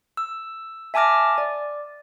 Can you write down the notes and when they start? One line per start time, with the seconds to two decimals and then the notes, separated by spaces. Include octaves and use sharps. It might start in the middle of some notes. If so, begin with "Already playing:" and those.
0.17 E6
0.94 E5 G#5 A5 D6 F6 A#6
1.38 D5